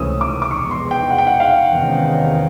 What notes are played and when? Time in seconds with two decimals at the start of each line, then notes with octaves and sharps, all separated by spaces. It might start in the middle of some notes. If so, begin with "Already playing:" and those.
Already playing: C#2 C3 E3 A3 C#4 D#6 E6
0.21 D6
0.42 D6
0.51 F1 E2 B2 G#3 C#6
0.71 C6
0.91 G5
1.10 F#5
1.18 G5
1.27 F#5
1.40 F5
1.70 E2 C3 D#3 G#3 C#4